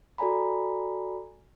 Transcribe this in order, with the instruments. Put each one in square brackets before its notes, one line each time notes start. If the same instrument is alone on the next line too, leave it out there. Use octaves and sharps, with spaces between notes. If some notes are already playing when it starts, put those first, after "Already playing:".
[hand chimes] F#4 A4 D5 G#5 A#5 B5